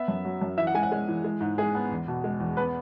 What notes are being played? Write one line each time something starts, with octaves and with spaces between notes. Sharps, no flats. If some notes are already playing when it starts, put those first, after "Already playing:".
Already playing: B3 E5
F#2
F#3
F#2
E3 E5
F#5
G#3 G#5
F#5
G#3
E3
G#3
G#2
G#3 G#4
B3
E2
B2
G#3
E2
B3 B4